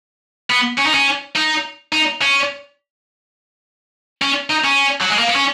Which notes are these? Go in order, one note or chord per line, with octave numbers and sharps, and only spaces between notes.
B3
C#4
D#4
C#4
D#4
D#4
C#4
C#4
D#4
C#4
F#3
G#3
A#3
B3
C#4